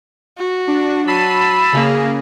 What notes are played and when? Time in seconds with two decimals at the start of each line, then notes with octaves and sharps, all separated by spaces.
0.38 F#4
0.67 D4
1.07 F#3 A5 B5 E6 C7 D#7
1.73 C#3 A#3 G#4